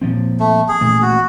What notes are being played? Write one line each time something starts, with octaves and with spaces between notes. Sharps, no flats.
A#2 F3 C4
A3
G#4
A1 A#2 A3
F#4